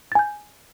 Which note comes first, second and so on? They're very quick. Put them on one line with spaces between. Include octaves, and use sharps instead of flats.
A6 G#5 G6